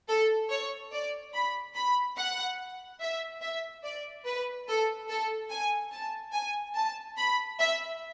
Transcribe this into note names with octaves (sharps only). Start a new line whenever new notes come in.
A4
C#5
D5
B5
B5
F#5
E5
E5
D5
B4
A4
A4
G#5
A5
G#5
A5
B5
E5